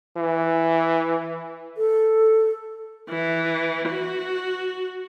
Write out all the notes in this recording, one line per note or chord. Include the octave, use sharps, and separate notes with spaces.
E3
A4
E3
F#4